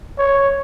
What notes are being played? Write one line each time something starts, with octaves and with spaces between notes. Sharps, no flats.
C#5